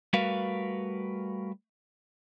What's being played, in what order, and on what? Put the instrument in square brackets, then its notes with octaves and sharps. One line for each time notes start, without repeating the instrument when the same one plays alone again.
[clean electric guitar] G3 A3 F#4 A#4 B4 F5